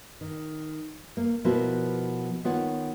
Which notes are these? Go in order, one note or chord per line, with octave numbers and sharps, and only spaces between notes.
D#3
A#3
B2 F3 B3 E4 F#4 A#4
D#3 B3 F4 C#5 F#5